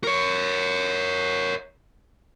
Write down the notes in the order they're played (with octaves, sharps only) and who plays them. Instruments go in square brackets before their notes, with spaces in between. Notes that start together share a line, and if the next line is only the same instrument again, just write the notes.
[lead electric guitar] A#4 C#5